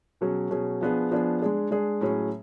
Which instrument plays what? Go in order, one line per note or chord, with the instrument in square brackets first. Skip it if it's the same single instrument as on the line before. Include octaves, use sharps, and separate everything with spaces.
[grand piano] B2 F#3 C#4 G#4
B2 F#3 C#4 G#4
F3 B3 D4 G#4
F3 B3 D4 G#4
G#3 D4 G#4
G#3 D4 G#4
A2 F#3 C#4 G#4